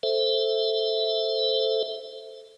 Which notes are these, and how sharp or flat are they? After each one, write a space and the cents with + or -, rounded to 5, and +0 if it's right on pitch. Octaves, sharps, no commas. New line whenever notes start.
A4 +0 C5 +0 E5 +0